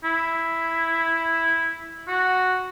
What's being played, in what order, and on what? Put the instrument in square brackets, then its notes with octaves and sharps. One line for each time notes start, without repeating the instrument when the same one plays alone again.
[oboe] E4
F#4